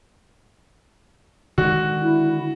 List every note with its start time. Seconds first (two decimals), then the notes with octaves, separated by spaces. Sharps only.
1.58 D3 D#3 G#3 F#4
2.02 E4